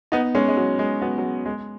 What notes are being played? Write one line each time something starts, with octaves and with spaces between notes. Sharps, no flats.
B3 D#4
G#3 C#4
G#3
F#3
G#3
F#3 B3
F#3
G#3
G#3